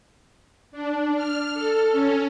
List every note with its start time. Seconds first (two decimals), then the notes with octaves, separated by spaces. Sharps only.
0.72 D4
1.16 F6
1.54 A4
1.92 C#4